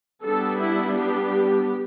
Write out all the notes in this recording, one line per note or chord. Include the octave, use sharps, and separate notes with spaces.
G3 B3 D4 A4
E4
G4